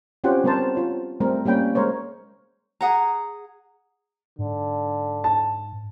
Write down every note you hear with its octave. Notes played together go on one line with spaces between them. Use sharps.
C4 C#4 F4 G4 C5 F#5
G3 B3 C4 A#4 C5 A5
F4 C#5
G3 A3 C4 A#4
G3 A#3 C#4 G5 B5
G#3 A#4 C5 C#5
G#4 F#5 A#5
G#2 D3
A5